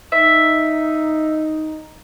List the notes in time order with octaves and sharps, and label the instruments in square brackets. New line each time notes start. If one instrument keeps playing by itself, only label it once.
[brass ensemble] D#4 [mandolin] E5